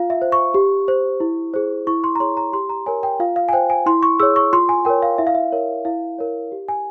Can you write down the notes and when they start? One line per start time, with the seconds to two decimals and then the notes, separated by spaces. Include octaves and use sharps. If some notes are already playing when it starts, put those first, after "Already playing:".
Already playing: F4 F5
0.10 E5
0.22 C5
0.32 C#6
0.54 G4
0.88 C5
1.20 E4
1.54 G#4 C5
1.87 E4 C#6
2.04 C6
2.15 A#5
2.20 G#4 C#5 C6
2.37 A#5
2.53 G4 C6
2.69 A#5
2.86 A#4 C#5 G#5
3.03 G5
3.20 F4 F5
3.36 F5
3.49 G#5
3.53 C5 G5
3.70 G#5
3.86 E4 C6
4.03 C#6
4.20 G#4 C#5 E6
4.36 C#6
4.53 F4 C6
4.69 G#5
4.85 A#4 C#5 G5
5.02 F5
5.18 E4 E5
5.27 F5
5.35 E5
5.52 A#4 C#5
5.85 E4 F5
6.18 A#4 C#5
6.52 G4
6.68 G#5